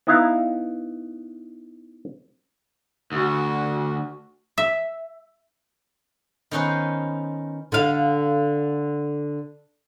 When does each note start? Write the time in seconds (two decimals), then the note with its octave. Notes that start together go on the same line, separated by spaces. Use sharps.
0.07 B3 D#4 E4 E5 F5 A#5
3.12 D2 F#4
4.58 E5
6.51 D#3 B3 C#4 D#4 B4 C5
7.72 D3 F5